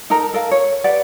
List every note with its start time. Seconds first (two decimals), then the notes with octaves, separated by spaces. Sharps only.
0.10 D#4 A4 A#4 A#5
0.34 A4 A#4 F5
0.51 C#5
0.84 G4 B4 D5 F#5